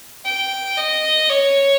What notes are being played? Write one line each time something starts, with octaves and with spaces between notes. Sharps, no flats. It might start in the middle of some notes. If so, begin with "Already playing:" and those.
G5
D#5
C#5